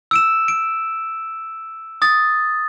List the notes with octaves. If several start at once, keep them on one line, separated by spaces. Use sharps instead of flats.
E6 D7 E7
D7
D#6 A6